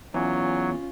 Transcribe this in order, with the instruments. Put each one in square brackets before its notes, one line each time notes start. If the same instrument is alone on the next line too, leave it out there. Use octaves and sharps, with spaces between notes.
[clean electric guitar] E2 [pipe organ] F#3 [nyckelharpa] C#4 F4